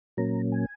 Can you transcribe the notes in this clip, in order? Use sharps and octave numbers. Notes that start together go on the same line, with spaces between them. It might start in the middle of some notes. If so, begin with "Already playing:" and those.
A#2 F#3 A#3 C#4 A#5
G#5